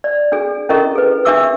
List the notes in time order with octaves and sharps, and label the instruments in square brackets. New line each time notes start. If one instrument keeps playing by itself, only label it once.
[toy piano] D5
D4 G#4
C#4 E4 A4 A#4 D#5 C#6
G#4 B4
D4 G4 E5 D6 E6